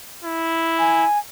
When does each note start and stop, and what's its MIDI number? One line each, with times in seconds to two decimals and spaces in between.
0.24 1.06 64
0.79 1.18 80